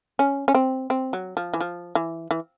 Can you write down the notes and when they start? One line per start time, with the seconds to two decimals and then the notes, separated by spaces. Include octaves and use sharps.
0.19 C#4
0.48 C#4
0.55 C4
0.90 C4
1.13 F#3
1.37 F3
1.53 E3
1.60 F3
1.95 E3
2.31 E3